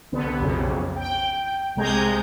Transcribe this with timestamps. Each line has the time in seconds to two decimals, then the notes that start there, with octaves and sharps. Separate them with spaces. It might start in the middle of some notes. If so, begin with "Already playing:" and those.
0.12 C2 D3 B3
0.40 B1 F2 C#3
0.96 G5
1.76 C2 C3 G#3 A#5 G6 G#6